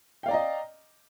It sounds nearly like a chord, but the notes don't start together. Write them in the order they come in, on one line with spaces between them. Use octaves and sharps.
G5 F5 D5 A#5 D#5